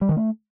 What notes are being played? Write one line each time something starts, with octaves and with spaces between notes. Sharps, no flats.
G3
D#3
A3